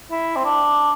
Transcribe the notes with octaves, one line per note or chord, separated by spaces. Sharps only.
E4
C4
D4